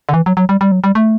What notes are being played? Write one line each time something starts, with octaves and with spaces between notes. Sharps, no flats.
D3
E3
F#3
F#3
G3
G3
F#3
G3
A3